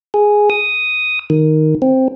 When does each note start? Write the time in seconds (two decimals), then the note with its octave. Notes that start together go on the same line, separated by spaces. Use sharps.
0.14 G#4
0.50 D#6
1.30 D#3
1.82 C4